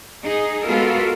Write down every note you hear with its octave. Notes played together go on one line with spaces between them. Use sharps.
D#4 G#4
G#3 B3 F4 F#4 A4 A#4